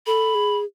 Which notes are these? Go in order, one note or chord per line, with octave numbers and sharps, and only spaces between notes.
A4 B5
G#4